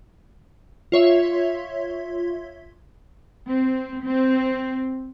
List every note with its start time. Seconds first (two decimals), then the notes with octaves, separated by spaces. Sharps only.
0.92 F4 C#5 E5
3.47 C4
4.04 C4